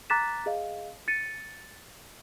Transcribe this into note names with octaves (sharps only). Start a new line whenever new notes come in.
A#5 D6 F#6 A6 B6 E7
G#4 D#5 F5
A6 C#7 D#7